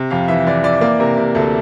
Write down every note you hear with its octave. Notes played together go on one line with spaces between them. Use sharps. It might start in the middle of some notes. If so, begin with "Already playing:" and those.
Already playing: C3
F2 F5
E3 E5
E3 D5
E3 D5
A#3 D5
C3 A#4
C3
D2 A4